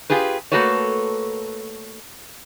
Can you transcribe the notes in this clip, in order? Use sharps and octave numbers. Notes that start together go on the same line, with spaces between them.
F4 G4 G#4 B4
A3 A#3 F#4 A4 B4 C#5